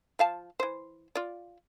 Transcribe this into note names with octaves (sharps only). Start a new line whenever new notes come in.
F3 F5 A5
E3 C5
F4 D5